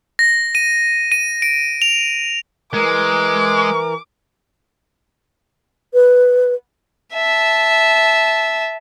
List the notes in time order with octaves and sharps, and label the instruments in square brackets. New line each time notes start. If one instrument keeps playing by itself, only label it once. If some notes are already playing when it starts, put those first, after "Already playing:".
[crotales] A#6
D#7
D#7
D7
F7
[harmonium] E3 A#4 [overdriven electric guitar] G#3 [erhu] D6
[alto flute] B4
[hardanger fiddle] E5 A5